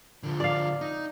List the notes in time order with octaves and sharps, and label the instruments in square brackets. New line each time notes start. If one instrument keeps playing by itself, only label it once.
[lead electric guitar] D3 F3
[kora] D5 F5
[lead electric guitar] D#4